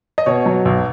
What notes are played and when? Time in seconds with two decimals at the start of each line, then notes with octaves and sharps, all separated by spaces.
0.18 D#5
0.26 B2 C#5
0.46 F#3
0.65 B1